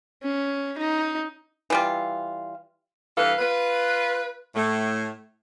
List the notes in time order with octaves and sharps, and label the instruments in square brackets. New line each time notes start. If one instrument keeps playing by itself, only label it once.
[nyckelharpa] C#4
D#4
[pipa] E3 G3 F4
[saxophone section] G2 E3 A4 B4 F5
F4 B4
A2 A3